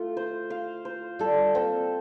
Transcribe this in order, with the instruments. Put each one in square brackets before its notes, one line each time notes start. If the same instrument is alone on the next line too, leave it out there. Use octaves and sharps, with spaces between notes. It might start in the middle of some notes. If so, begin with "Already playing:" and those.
Already playing: [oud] A3 [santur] F4
[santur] C5
F5
C5
[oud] G3 [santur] A4
[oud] A#3 [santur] C4